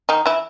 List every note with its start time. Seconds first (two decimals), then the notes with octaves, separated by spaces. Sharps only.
0.09 D#3 D#4
0.26 E3 E4